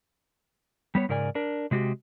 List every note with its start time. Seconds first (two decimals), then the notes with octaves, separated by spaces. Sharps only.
0.95 G3 B3 C#5
1.09 G#2 C#3 A#4 D5 G#5
1.35 D4 A#4
1.71 C3 G#3 F#4 G4